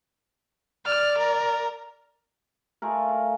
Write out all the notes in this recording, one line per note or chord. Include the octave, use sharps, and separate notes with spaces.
D5 F6
A#4
A3 F4 G#4 A#4
F5